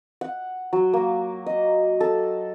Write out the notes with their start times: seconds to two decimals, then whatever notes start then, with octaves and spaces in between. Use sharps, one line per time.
0.21 F#5
0.73 F#3
0.93 A#3
1.46 D#5
2.00 A4